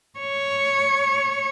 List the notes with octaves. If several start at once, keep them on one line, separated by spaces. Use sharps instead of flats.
C#5